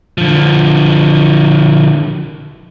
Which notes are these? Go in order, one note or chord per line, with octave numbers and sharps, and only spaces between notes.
D3 F3